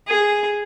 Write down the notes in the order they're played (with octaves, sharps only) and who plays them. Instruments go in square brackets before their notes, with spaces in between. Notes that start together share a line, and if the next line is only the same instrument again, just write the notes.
[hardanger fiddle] G#4